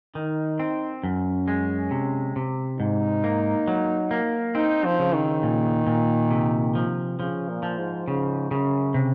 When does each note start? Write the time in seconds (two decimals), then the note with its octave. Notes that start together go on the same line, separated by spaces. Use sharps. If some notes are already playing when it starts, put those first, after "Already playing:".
0.15 D#3 D#4
0.59 C4
1.04 F#2 C#4
1.48 G#3
1.91 C3
2.36 C3
2.79 G#2 D#4
3.24 A#3
3.68 F#3
4.11 A#3
4.55 C4 D#4
4.85 F3
4.99 C#3
5.14 D#3
5.43 A#2
5.87 A#2
6.31 C3
6.75 F3
7.19 C#3 F3
7.49 A#2
7.63 F3
7.78 G#2
8.08 G#2 C#3
8.51 F#2 C#3
8.94 C3